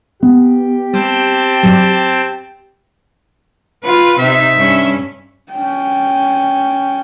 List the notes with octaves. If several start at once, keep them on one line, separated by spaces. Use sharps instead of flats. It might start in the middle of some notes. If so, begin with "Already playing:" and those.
B3 G4
G3 C4 G5 A5
G2 F#3
F4 B4
C3 D#4 E5
G2 C#4
C#4 G5